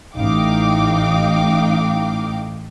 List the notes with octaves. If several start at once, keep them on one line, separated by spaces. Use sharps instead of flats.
A1 A2 D#4 F5 G5 D6